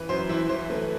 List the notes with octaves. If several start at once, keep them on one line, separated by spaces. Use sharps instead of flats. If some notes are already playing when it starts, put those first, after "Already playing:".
Already playing: E3 B4
F#2 C5
E3 E4 E5
E3 C5
A3 B4